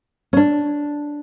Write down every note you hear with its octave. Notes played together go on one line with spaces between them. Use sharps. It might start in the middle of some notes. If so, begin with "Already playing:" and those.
C#4
D4